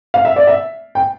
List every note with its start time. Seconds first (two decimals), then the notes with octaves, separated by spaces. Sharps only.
0.14 F5
0.25 E5
0.36 D5
0.47 E5
0.95 G5